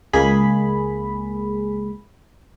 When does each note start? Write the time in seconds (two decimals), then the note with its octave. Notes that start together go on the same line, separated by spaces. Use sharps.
0.13 C#2 G#3 A#3 G#4 B5